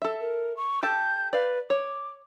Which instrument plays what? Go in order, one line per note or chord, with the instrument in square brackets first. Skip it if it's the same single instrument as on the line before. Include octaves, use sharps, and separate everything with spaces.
[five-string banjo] A4 E5
[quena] A#4
C#6
[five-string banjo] G4 A4 A5 [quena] G6
[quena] B4 [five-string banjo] D5 F5
[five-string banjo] C#5 [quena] D6